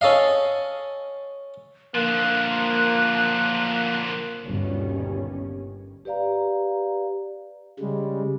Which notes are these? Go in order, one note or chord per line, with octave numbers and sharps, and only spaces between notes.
C#4 A4 D#5 F5
D3 F3 A#3 F#6
G1 D#2 B2 G3 C#4
G4 B4 D5 F5 A#5
C#3 G3 G#3